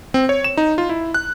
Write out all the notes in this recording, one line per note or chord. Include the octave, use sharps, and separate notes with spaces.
C4
C#5
E7
D#4
F4
E4
F#6